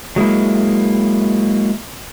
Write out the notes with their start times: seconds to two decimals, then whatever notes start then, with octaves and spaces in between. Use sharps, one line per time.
0.16 F#3 G#3 A#3 E4